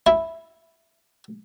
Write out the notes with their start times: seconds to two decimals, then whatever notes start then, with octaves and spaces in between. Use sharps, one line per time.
0.07 E4